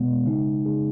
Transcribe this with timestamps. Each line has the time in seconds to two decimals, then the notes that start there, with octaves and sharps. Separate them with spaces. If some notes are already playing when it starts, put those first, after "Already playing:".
Already playing: B2 G#3 B3
0.25 C#3 G#3 D#4
0.66 C#3 G#3 D#4 G#4